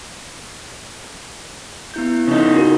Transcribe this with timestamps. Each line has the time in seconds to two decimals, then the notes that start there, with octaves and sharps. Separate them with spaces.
1.94 B3 E4 G6
2.28 C#3 D#4
2.53 F4 F#4 A#4